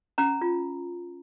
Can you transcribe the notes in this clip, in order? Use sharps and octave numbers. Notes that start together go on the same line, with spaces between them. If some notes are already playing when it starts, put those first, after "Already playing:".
C#4 A#5
F4